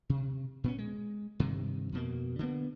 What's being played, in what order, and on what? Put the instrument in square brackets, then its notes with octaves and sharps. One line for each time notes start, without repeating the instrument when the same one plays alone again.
[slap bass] C3
A#2 B3 C#4
G#3
G2 C3 D#3
F2 B2 A#3
D3 A#3 B3